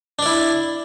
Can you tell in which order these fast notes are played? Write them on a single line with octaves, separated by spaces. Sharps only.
D4 D5 E4